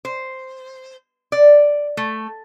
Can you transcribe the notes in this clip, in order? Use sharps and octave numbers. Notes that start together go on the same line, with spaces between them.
C5
D5
A3